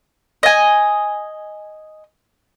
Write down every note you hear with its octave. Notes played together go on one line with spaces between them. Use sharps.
D#5 G#5